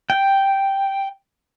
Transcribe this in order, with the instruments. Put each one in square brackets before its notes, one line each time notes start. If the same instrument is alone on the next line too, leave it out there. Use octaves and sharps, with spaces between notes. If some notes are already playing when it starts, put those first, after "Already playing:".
[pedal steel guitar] G5